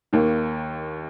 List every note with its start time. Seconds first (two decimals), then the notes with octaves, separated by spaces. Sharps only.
0.13 D#2 D#3 A#3